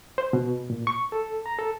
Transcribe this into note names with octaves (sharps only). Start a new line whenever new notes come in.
C5
B2
A#2
C#6
A4
A#5
A4